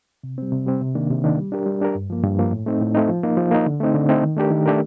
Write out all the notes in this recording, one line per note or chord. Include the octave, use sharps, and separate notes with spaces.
C3
G3 C4
C3
G3 C4
C3
D#3 A#3 D4
C3
D#3 A#3 D4
G3
D4 G4 A#4
G3
D4 G4 A#4
G2
F3 A#3
G2
F3 A#3
A2
A3 C4 D#4
A2
A3 C4 D#4
F3
A#3 D#4
F3
A#3 D#4
D3
A3 C4 D#4
D3
A3 C4 D#4
D#3
A3 D4 G4 A#4
D#3
A3 D4 G4 A#4